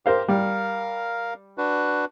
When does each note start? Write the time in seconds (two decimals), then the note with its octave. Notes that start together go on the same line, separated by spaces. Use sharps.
0.06 G4 A#4 C5 F5
0.28 G3 A#4 F5
1.58 D4 F#4 B4